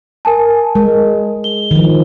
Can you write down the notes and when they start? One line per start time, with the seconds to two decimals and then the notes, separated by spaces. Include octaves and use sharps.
0.25 A#4 G#5 A5
0.75 G#3 A#4
1.44 G7
1.71 D#3 F3